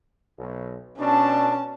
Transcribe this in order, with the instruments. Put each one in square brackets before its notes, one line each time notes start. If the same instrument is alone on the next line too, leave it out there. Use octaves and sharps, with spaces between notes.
[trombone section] B1
[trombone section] B2 D4 [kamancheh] C#4 A5